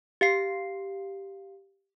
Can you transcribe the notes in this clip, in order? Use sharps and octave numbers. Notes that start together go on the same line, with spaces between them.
G4 F5 C7